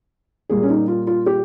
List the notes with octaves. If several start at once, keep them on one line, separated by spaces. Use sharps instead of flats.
A#2 G3 A#3 G#4
C#4
D#4
F4
F4
G4